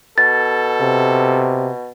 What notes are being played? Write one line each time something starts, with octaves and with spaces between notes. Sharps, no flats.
B2 A4 A6
C3